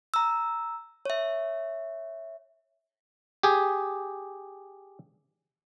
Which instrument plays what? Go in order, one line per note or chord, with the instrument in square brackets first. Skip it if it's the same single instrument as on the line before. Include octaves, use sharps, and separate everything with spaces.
[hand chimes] A#5 E6
C#5 E5
[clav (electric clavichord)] G4 G#4